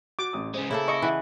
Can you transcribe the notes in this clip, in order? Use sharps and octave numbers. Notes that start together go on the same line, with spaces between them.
F#4 D6
A1 D#6
C#3 G#3 G#4 C5
C#3 A#3 E4 A4
D#5 C#6
E3 B4 E5 F#5 F#6